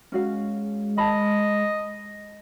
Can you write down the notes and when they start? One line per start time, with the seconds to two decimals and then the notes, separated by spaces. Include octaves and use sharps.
0.12 G#3 C#4 F#4 F5
0.98 D#5 A5 B5